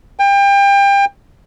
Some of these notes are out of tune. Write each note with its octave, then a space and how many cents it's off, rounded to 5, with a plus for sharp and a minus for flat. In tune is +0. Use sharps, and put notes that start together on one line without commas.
G5 +30